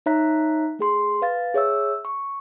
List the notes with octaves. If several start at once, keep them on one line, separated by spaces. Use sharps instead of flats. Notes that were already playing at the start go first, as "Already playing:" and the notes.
D#4 C#5 E5 A#5 F#6 B6
A3 G#4 C6
B4 F5 A6
G#4 C#5 E5 E6
C#6